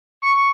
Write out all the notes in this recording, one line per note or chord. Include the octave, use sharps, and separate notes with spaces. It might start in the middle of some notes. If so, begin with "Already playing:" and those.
C#6